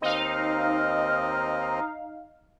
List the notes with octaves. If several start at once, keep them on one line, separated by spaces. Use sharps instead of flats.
D#2 C4 D#4 D#5 F5